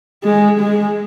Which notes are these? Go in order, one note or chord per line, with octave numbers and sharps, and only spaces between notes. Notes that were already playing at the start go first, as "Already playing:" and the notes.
G#3
G#3